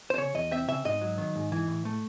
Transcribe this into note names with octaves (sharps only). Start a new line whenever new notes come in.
C5
C#3 C#5
E2 D#5
C4 E5
C#3 E5
G#2 D#5
F#3
D#3
G#2
E3
A2
A3